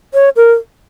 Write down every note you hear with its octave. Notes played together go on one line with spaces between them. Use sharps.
C#5
A#4